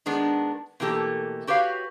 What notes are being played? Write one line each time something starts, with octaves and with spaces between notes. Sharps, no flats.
D#3 G#3 B3 D4
B2 E3 A3 A#3 G4 A4
F#4 G4 B4 C#5 F5